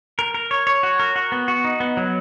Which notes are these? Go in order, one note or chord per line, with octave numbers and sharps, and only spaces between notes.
A#4
A#4
C#5
C#5
F#4
A#4
F#4
B3
F#4
D#4
B3
F#3